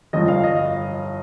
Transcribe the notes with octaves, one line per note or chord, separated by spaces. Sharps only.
G1 G2 F3 D#5
F5
D#5